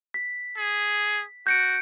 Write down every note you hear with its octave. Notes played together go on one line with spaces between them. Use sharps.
B6
G#4
F#4 G6 C#7 D7